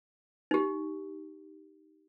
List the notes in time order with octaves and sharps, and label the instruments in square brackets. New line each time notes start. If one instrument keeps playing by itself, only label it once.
[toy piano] D#4 G4